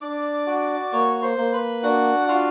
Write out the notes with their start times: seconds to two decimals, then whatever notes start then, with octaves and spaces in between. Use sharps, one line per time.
0.01 D4 D5 D6
0.47 F#4
0.92 A#3 C#5 C#6
1.22 C5 C6
1.37 A#3
1.53 B4 B5
1.83 D4 F#4 F#5
2.28 F4 F#4 F5